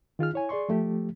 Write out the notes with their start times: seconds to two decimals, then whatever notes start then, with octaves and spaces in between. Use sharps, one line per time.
0.19 D#3 F4 G#4 F6
0.33 E4 C#5 G#5
0.49 G#4 D5 C6 C#6
0.69 F3 A3 G4